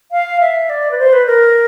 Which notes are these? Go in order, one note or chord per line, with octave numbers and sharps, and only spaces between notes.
F5
E5
D5
B4
C5
B4
A#4